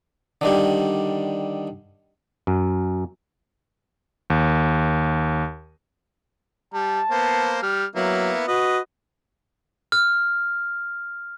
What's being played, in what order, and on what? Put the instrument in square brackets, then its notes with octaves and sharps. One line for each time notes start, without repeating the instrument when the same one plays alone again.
[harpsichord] D3 D#3 G3
[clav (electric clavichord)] F#2
[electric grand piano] D#2
[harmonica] G3 [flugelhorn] A5
[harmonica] A#3 B3 C5
G3 F6
[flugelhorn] F#3 [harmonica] A#3 B3 E4
[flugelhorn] F#4 [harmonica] B4 D#5
[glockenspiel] F6